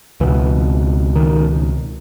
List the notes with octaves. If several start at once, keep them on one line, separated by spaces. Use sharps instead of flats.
C#2 B2 E3
D#3